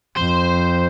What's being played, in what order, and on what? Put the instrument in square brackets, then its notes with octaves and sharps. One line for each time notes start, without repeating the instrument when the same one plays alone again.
[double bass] F2 [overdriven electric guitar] C5